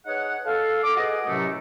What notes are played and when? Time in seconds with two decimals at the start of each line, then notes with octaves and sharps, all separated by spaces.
0.06 D#4 G#4 B4 C#5 F#5
0.45 A4 F5
0.83 D6
0.96 F#4 G#4 B4 D#5
1.27 F#2 A2 C3 F#3 A3